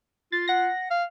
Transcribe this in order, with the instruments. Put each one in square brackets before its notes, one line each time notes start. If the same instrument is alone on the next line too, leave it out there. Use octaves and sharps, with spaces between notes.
[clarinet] F4 [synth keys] A6
[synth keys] F#5 A#6
[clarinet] F5